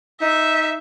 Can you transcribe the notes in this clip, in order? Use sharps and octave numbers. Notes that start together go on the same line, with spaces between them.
D#4 E5